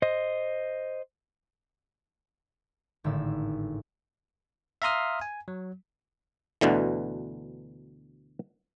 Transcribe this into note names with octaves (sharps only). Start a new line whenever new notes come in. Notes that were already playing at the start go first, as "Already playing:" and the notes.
C5 D#5
G#1 A2 D3 A3 E6
E5 F5 A#5 C6 D#6 F6
G#5
F#3
D2 B2 D3 E3